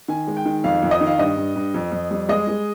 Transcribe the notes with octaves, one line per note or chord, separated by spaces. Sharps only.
D#3 G#5
G#3
G5
D#3
F2 F5
F2
D#5
D#3
F5
G2 D#5
G2
G2
F2
F2
G3
G#3 D#5
G#3